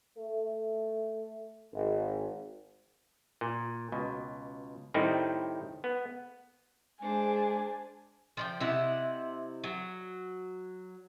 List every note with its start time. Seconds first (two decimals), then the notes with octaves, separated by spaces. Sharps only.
0.17 A3
1.73 G#1
3.41 A#2
3.92 C#2 B2
4.94 A2 D#3 G3 C4 D#4 E4
5.84 B3
7.02 G#3 D4 C5 G#5
8.37 F3 D5 G5
8.60 C3 E4 D#5 F#5
9.64 F#3